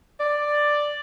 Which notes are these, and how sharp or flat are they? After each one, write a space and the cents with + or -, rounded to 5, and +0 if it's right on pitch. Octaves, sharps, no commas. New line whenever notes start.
D5 +5